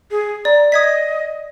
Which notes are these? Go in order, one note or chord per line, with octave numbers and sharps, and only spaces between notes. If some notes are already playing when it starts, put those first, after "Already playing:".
G#4
D5 A#5
D#5 D#6 G#6 B6